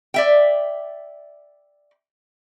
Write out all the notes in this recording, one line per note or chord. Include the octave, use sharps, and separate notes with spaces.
D5 E5 G5